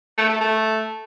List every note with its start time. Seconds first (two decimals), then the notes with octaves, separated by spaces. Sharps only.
0.18 A3
0.29 A3
0.41 A3